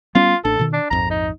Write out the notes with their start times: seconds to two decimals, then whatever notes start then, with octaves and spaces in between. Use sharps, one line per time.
0.15 G3 B3 C#4 F4
0.45 A1 D4 A4
0.59 B2 D#3
0.73 D4
0.91 A#1 F2 G#2 A#5
1.11 D#4